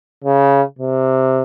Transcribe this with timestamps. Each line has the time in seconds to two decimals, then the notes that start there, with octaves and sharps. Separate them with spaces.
0.24 C#3
0.79 C3